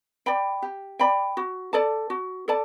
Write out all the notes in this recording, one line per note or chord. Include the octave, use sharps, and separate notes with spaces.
D5 G5 B5
G4
D5 G5 B5
F#4
A4 D5 A5
F#4
A4 D5 A5